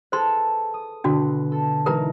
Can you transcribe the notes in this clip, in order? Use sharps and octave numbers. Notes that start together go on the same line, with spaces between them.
G#4 A4 B4 C5 C6
D#6
B2 D3 D4 F#4 B4
A4
E3 G#3 D#4 A#4 B4 A#5